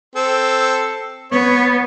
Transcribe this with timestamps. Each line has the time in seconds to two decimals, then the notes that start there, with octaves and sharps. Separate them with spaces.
0.16 C4 A4
1.32 B3 C#5